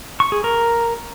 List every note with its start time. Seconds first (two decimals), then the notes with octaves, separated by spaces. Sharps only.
0.20 C#6
0.32 G#4
0.44 A#4